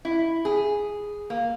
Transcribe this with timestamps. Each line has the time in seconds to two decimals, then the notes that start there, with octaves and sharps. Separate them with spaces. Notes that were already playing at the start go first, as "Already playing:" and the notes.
0.05 E4
0.45 G#4
1.30 A#3